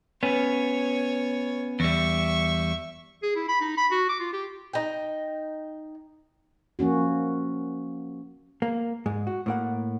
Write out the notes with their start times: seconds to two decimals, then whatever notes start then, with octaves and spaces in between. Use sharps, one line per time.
0.23 B3 C#4 C#5
1.80 E2 G3 E5 C#6
3.23 G#4
3.36 E4
3.48 B5
3.61 D#4
3.77 B5
3.91 F#4
4.09 D6
4.20 F4
4.33 G4
4.73 D#4 G5
6.79 F3 A#3 C#4 F#4
8.62 A#3
9.06 G#2 G#3
9.27 F#4
9.46 A2 A#3 F#5